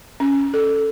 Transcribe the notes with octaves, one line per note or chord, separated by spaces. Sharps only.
C#4
A4